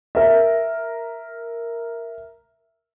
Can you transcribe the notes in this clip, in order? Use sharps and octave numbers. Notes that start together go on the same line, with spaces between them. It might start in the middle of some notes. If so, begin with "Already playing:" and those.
A#4 E5